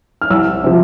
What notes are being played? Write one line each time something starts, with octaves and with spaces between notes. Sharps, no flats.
F6
C2 E6
C3 F3